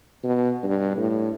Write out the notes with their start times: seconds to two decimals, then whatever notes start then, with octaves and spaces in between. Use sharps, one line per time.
0.24 B2
0.63 G2
0.97 A2